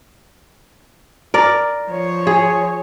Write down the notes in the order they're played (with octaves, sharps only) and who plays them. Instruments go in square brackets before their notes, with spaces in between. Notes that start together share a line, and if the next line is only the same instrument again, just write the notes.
[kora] A#4 D5
[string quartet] F3 C#5
[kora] G#4